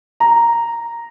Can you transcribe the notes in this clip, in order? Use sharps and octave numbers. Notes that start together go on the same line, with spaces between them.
A#5